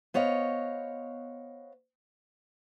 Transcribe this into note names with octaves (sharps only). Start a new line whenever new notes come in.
B3 C5 C#5 D#5 F5